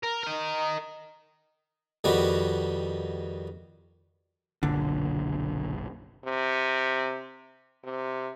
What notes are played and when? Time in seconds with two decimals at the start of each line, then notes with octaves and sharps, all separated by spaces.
0.03 A#4
0.23 A#4 D#5
2.04 F2 D#3 G3 B3 F#4
4.63 F#1 B1 A#2 D3
6.25 C3
7.84 C3